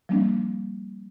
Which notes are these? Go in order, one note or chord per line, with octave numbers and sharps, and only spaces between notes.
F3 G3 A#3 C4 D4